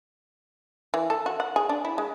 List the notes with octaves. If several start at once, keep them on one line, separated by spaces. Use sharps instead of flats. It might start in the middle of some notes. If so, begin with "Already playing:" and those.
E3
A4
F#4
F#5
G#4
D4
E4
G#3